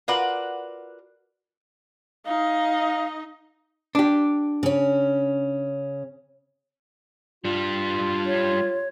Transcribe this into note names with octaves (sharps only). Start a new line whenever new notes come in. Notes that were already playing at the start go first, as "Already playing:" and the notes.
F4 F#4 A#4 B4 D5 F#5
D#4 D#5 F5
D4 G4
C#3 C#4
G3 D4 F4
C#5